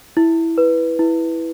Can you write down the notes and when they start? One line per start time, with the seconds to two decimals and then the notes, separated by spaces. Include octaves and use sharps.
0.17 E4
0.58 B4
0.99 E4